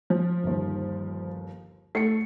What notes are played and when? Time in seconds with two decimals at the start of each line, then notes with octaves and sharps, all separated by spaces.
0.10 F3
0.44 G1 D#2
1.95 A3 C7 C#7